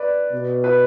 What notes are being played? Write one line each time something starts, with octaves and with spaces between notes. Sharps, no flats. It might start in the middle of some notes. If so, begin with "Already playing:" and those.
Already playing: B4 D5
B2
B4